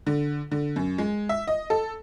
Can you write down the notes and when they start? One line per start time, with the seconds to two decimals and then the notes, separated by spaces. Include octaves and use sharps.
0.07 D3
0.51 D3
0.76 F#2
0.98 G#3
1.29 E5
1.47 D#5
1.70 A4